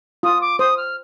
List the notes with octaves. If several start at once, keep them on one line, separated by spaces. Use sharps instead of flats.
F4 D#6
D6
C5 D#6
F6